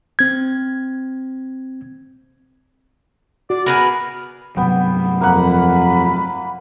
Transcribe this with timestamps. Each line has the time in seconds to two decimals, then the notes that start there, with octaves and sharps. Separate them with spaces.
0.19 C4 G#6
3.50 F#4 D5
3.66 B3 G#4 A#4 B4
4.57 G2 C3 F#3 B3 G5
5.21 F2 A#3 F#5 B5